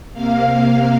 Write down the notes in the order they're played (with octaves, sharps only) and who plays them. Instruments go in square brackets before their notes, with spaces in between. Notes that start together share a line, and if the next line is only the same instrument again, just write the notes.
[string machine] C3 A#3 F5